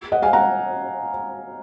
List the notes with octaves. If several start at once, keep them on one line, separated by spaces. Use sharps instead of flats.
D#5 F#5
F5 G#5
F#5 A#5